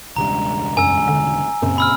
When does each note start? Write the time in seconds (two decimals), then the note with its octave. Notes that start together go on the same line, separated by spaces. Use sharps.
0.16 E1 C#2 G2 A#5
0.77 F#2 G#5 E6
1.08 D3
1.62 F#2 A#2 C#3 C4
1.78 B5 E6 F6